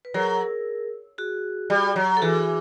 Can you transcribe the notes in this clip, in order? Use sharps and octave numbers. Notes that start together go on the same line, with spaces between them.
B4
F#3 G#4 A#4
F#4 G#4
G3
F#3
A4
E3 F#4 G#4